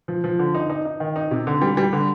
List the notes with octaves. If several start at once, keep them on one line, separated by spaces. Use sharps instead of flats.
F3
F3
D3
D#4
D#4
D#4
D#3
D#4
C3
D3
G3
G3
D3